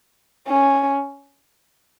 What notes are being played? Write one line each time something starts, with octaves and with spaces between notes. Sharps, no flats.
C#4